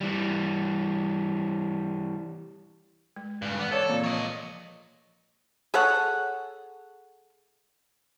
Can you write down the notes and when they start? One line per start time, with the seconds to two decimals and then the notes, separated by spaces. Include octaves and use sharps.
0.01 E3 G3
3.16 G#3
3.42 G2 C#3
3.60 E3 B3
3.72 A4 C#5 D5
3.89 A#2 C4
4.04 F3 C#5 D#5
5.74 G#4 A4 C#5 F#5